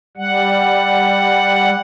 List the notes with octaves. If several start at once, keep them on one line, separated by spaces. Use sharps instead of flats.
G3 F#5